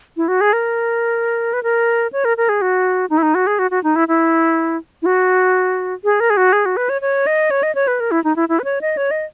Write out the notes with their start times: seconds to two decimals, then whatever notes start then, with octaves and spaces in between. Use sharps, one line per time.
0.17 E4
0.28 F#4
0.41 G#4
0.53 A#4
1.53 B4
1.63 A#4
2.13 C#5
2.25 A#4
2.37 A#4
2.49 G#4
2.62 F#4
3.10 D#4
3.18 E4
3.23 D#4
3.35 F#4
3.47 G#4
3.59 F#4
3.71 F#4
3.84 D#4
3.96 E4
4.08 E4
5.02 E4
5.06 F#4
6.04 G#4
6.20 A#4
6.30 G#4
6.37 F#4
6.53 G#4
6.66 F#4
6.77 B4
6.89 C#5
7.02 C#5
7.27 D#5
7.51 C#5
7.63 D#5
7.75 C#5
7.87 B4
8.00 A#4
8.11 E4
8.24 D#4
8.36 E4
8.49 E4
8.59 B4
8.64 C#5
8.81 D#5
8.97 C#5
9.11 D#5